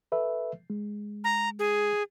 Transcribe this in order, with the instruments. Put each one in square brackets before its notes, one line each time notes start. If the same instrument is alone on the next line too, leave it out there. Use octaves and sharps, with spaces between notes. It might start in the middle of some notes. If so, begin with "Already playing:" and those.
[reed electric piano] A4 B4 E5
G#3
[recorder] A#5
G#4